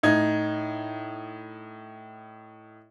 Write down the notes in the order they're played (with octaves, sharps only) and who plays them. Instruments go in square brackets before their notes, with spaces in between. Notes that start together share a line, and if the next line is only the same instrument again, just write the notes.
[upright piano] A2 D#4 G#6